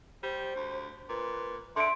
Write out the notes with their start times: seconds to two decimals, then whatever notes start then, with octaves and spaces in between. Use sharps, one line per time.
0.23 G3 C5
0.56 D2
1.09 A#2 B4
1.76 D3 E5 C6 D7